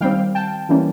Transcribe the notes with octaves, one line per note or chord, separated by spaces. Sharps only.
D#3 G3 C4 F5 G5
G5 A5
E3 G3 A#3 C#4